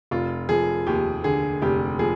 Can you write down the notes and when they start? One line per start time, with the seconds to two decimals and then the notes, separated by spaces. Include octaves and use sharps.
0.11 F1 F4
0.49 F3 G#4
0.87 D#2 G4
1.24 D3 G#4
1.62 F1 G4
1.99 F3 G#4